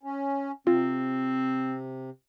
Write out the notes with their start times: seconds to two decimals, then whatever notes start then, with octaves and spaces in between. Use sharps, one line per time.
0.03 C#4
0.67 C3 C4 F4